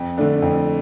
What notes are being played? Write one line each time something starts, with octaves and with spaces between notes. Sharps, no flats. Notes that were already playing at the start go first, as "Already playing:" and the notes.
Already playing: F2
D3 A3 D4 A4
F2